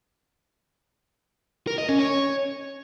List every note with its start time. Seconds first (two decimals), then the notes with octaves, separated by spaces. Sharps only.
1.67 A#4
1.78 D#5
1.89 C#4
1.99 C#5